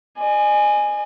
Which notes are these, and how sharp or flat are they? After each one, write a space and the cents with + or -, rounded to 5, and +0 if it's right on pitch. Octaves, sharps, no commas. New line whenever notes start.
D#5 -45 G#5 +0